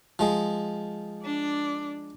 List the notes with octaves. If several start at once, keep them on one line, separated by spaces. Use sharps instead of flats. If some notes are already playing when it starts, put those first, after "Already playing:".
F3 G#3
D4 D5